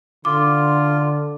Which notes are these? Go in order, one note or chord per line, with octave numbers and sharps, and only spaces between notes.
D3 F4 D6